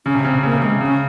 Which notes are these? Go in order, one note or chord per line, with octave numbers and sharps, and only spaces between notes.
C#3 C#4
C3
C#3 C4
C3
C#3 A#3
C3
C#3 G#3
C#3 C#4